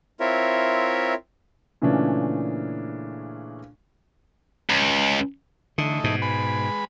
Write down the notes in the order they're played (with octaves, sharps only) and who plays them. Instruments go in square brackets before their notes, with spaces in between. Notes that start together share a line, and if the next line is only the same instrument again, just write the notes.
[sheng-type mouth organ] C4 E4 F4 A#4 C#5 E5
[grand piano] A#2 C#3 E3 A3 C#4 D4
[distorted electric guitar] C#2
[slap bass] D3 [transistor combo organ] E3 A3 D#4
[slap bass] G#2 B2
[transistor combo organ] G#3 B4 B5